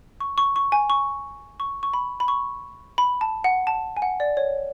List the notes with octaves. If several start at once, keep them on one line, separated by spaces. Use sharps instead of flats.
C#6
C#6
C#6
G#5
C#6
C#6
C#6
B5
B5
C#6
B5
A5
F#5
A5
G#5
F#5
D5
C#5